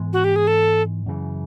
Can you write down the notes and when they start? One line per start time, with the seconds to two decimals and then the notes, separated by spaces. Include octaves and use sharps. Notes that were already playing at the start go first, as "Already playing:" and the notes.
Already playing: G#2 E3 G#3 B3
0.13 F#4
0.24 G4
0.36 G#4
0.47 A4
1.06 F#2 C#3 E3